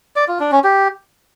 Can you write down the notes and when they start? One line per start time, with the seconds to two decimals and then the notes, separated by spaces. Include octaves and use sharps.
0.16 D5
0.28 F4
0.40 D4
0.52 C#4
0.64 G4